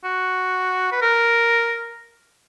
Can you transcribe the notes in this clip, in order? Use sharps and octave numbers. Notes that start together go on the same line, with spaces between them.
F#4
B4
A#4